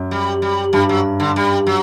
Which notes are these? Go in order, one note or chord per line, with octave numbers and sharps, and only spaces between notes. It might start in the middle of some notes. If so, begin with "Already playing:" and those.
Already playing: F#2
G3
G3
G2 G3
F#3
D3
G3
F#3